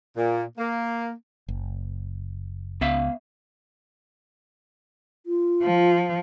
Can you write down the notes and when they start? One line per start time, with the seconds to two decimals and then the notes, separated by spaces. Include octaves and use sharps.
0.17 A#2
0.58 A#3
1.48 F#1
2.81 C#2 B3 E5 F5
5.26 F4
5.63 F3